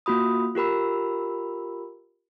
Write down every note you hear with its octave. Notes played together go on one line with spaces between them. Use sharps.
A#3 F4 F#4 B5 D#6
F4 G4 A#4 B5 E6